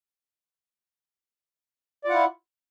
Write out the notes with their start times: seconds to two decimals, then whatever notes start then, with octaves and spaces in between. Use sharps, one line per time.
2.05 D5
2.07 F4
2.10 F#5
2.13 E4